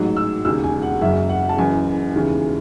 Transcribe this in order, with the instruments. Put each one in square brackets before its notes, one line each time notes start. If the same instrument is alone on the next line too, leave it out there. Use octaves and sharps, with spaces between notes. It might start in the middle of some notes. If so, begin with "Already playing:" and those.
Already playing: [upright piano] A1 G#2 F#3
E6
E1 D#2 C#3 E6
G#5
F#5
F#1 F#2 C#3 F#3 E5
F#5
A5
F#1 F#2 E3 G#5
E1 D#2 C#3 E3